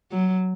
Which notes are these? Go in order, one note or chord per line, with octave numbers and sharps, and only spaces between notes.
F#3